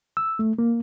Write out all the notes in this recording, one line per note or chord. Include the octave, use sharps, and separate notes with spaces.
E6
A3
A#3